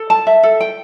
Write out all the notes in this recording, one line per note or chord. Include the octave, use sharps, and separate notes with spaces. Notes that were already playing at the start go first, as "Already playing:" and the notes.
Already playing: A4
A5
E5
A4
G5